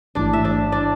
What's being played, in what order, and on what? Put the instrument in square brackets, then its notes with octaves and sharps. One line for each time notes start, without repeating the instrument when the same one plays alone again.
[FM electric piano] A1 G#2 E3 A3 E4 [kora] D4 D5
[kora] E5
D4 D5
D4 D5